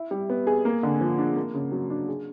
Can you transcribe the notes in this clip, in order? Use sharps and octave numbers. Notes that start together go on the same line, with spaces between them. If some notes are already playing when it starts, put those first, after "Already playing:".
Already playing: E4
G3
B3
G#4
A#3
D3
F3
D4
A#3
C#3
F#3
D4
G#4